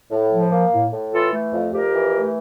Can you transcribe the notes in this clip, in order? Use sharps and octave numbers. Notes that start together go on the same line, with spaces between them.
A2
F3
A#3
A2
A2
E3 F4 A4
A3
F2
F2 G4 A#4
E3
A3